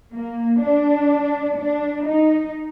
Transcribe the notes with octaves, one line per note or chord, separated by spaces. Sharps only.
A#3
D4
D4
D#4